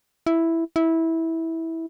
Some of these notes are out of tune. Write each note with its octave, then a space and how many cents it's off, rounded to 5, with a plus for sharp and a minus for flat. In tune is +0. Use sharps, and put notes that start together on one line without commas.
E4 +0
E4 -15